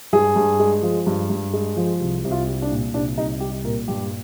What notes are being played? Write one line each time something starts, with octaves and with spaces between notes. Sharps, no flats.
G2 G#4
G2
G#3
F3
G2
G2
G#3
F3
C2
C2
F4
G3
D4
A#2
C2 D4
C2 D#4
G3 G4
A#2 A#4
G2 G4